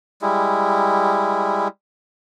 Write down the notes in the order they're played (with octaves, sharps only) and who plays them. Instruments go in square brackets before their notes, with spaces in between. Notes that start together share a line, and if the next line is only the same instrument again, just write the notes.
[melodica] G3 G#3 E4